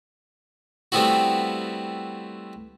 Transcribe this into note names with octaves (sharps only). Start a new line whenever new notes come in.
G3 A3 B3 C4 E4 F#4